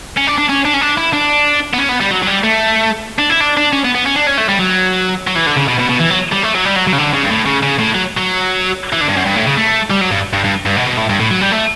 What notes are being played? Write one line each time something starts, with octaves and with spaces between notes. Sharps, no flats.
C#4
D4
D4
C#4
D4
C#4
D4
E4
D4
B3
C#4
B3
G3
F#3
F#3
G3
A3
D4
E4
D4
D4
C#4
B3
B3
C#4
D4
C#4
A3
G3
F#3
F#3
E3
D3
C#3
B2
B2
B2
E3
F#3
G3
A3
F#3
G3
F#3
F#3
C#3
D3
C#3
G2
A2
C#3
C#3
A2
F#3
F#3
E3
D3
G2
F#2
G2
A2
C#3
A3
G3
F#3
G2
G2
G2
G2
B2
B2
A2
G2
A2
F#3
G3
A3